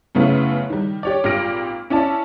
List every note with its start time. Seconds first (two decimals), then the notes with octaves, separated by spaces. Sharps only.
0.15 F#2 C#3 A3 B3 E4
0.70 D#3 G3
1.03 G4 C#5 D5
1.24 G#1 A#2 G4 F6 A#6 D7
1.90 C#4 E4 D5 A5